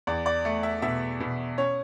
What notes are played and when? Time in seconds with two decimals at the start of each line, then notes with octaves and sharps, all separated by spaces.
0.07 E2 D5
0.26 D5
0.45 A3
0.63 E5
0.82 B2 E5
1.20 B2
1.58 C#4 C#5